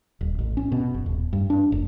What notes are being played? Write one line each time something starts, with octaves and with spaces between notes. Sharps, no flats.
D#1
A1
C#4
B2
F#1
D#1
G2
D4
F1